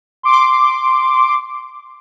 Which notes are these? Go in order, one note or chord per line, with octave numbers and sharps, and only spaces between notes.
C6 D6